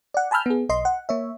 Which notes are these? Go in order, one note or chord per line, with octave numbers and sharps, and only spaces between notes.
D5 F#5
G#5 A5 B5 E6 F6 G6
B3 G#4
B1 D#5 C6
F#5
A#3 C#5 E5